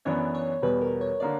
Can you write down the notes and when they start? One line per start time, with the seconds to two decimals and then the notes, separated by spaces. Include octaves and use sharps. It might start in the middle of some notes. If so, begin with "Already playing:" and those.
0.05 F#2 E3 B3 D4 C#5
0.35 C#5
0.62 E2 B2 G3 B4
0.81 A#4
1.01 C#5
1.20 D3 A#3 D4 D5